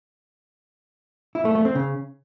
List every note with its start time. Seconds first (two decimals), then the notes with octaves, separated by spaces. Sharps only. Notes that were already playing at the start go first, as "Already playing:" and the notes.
1.35 E4
1.45 A3
1.55 A3
1.65 C4
1.75 C#3